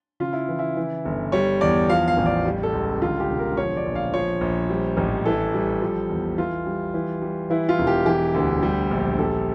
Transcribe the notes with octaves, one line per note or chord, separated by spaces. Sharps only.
C#3 F4
E4
E3
E4
E3
G1
G3 C#5
E2 D5
F3 F5
F5
A1
D5
G3
A4
C#2
D3 F4
G4
E1
A#4
F3 C#5
D5
A#1
F5
F3 C#5
A#1
G3
A1
E3 A4
G3
F3
E2
E3 F4
G3
E3
G3
E3 E4
F4
E1
G4
E3 G4
D2
G3
A#1
G3 A4